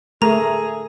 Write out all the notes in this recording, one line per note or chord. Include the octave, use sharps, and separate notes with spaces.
A3 G#4 A#4 A#5